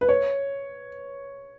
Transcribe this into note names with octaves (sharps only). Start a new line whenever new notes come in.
B4
C#5